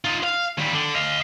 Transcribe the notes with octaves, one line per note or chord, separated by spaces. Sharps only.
D#4 F4
F5
D#2 G3
D3
D#5 F5